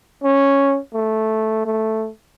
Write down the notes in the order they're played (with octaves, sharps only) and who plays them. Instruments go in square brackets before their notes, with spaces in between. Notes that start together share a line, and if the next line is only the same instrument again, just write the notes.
[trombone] C#4
A3
A3